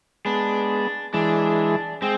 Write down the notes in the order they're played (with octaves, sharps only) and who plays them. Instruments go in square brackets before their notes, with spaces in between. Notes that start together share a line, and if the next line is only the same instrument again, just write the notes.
[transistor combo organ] G#3 B3 [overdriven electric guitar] D4
[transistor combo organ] E3 G#3 [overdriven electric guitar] D4
[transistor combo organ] G#3 [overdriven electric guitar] C4